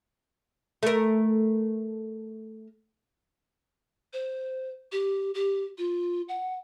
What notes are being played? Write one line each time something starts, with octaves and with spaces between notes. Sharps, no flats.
A3 A#4
C5
G4
G4
F4
F#5